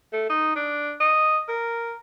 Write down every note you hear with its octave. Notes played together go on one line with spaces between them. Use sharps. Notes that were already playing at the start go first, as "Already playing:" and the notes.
A3
D#4
D4
D#5
A#4